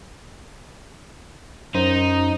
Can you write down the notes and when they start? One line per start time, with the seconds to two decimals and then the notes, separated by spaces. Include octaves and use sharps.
1.75 F#2 D#4 C5 D#5